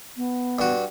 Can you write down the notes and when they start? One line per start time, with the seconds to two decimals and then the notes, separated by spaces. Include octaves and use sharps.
0.17 B3
0.59 G2 F#4